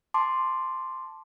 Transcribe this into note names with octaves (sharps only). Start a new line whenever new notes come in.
A5 C6 D6